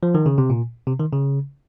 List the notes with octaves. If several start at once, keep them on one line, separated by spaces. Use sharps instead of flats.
F3
D#3
C#3
C3
A#2
C3
D#3
C#3